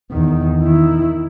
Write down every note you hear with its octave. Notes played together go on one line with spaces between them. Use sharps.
E2 D#3
D#3 E4